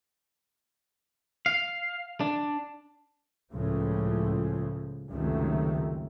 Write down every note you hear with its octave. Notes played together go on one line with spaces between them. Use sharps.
F5
D4
C#2 A2 C#3 F3
C#2 F#2 C3 D#3 A3